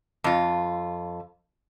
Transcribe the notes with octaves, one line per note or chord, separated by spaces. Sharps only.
F2 F4